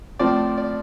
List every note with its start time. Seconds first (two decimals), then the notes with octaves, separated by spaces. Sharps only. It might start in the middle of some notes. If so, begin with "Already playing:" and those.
0.19 A2 F3 C4 D5
0.57 D5